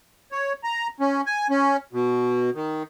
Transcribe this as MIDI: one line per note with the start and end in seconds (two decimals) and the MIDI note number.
0.32 0.53 73
0.64 0.87 82
1.00 1.21 61
1.26 1.47 80
1.50 1.77 61
1.93 2.50 47
2.55 2.83 51